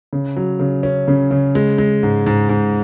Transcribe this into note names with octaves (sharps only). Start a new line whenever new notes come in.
C#3
F#3
C#3
C#4
C#3
C#3
G#3
G#3
G#2
G#2
G#2